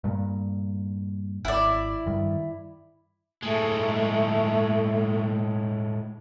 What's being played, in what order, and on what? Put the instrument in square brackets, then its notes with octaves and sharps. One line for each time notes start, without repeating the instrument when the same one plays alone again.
[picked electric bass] G2 A#2
[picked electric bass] G#1 [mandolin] E4 D5
[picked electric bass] G2 D#3
[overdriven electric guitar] A2 G#3 [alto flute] A3